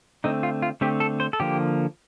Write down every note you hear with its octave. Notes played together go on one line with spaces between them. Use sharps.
D3 A3 C4 D#4
F4
F4
D3 A3 C4 G4
A4
C5
A4
D3 F3 A#3 G4